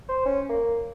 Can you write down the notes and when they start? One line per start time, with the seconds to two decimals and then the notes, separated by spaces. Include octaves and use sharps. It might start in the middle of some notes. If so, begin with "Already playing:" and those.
0.09 C5
0.26 C#4
0.49 A#3